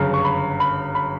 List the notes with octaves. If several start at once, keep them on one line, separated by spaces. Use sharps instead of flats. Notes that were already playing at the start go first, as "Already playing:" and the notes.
Already playing: G1 F#2 C#3
C#6
B5
B5
B5